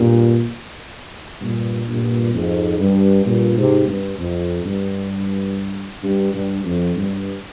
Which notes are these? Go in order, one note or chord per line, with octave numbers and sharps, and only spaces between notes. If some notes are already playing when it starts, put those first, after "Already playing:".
Already playing: G2 A#2
G2 A#2
G2 A#2
F2 G#2
G2
G2 A#2
G#2 C3
G2
F2
G2
G2
G2
F2
G2